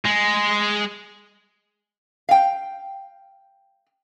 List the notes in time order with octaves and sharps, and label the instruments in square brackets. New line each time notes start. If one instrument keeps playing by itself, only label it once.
[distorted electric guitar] G#3
[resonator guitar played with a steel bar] F5 G5